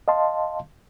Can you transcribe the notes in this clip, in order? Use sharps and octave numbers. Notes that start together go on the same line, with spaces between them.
D#5 F5 A5 C6